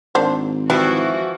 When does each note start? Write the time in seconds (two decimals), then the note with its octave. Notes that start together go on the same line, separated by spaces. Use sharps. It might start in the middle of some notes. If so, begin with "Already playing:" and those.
0.15 G#1 A#3 D4 C5
0.70 E3 F3 G3 E4 F#4